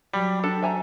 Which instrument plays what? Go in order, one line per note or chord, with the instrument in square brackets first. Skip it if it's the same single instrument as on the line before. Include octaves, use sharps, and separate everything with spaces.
[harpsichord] F#3 [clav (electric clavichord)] G3
[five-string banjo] D4 [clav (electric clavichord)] A4
[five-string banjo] E5 G#5 A#5